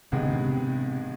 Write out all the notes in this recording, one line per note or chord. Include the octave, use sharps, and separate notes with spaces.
A1 G2 C3 D#3 G#3 B3
C#3
C3